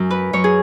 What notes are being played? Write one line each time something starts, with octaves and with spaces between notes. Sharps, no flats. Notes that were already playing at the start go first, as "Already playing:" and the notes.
Already playing: F#2
B4
F#2 C#5
G#4